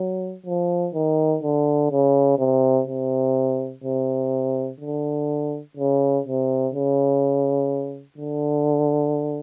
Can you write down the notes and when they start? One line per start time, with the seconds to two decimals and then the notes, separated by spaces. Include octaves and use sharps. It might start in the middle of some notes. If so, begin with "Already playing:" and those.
Already playing: F#3
0.46 F3
0.94 D#3
1.43 D3
1.91 C#3
2.39 C3
2.88 C3
3.84 C3
4.80 D3
5.77 C#3
6.25 C3
6.74 C#3
8.18 D3